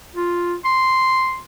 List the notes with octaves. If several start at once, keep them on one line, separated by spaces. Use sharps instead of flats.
F4
C6